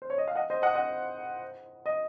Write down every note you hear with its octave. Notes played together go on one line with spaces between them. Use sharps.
C5
C#5
D#5
F5
D#5 F#5
C5 D#5
D#5 F#5
D#5 F#5
D#5